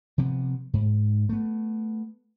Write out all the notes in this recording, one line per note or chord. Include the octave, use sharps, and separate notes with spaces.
C3 F3 B3
G#2
A3 B3